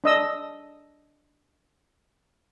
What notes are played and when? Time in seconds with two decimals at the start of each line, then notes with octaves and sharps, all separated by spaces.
0.04 D4 D#5 E6